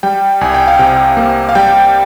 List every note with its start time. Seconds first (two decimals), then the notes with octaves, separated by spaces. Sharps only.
0.03 G3 G5
0.41 C2 G#5
0.54 G5
0.67 F5
0.79 C3 G5
1.17 A#3
1.49 F5
1.55 G3 G5